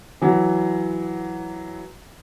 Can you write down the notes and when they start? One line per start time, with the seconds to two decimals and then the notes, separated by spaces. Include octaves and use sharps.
0.22 E3 F#3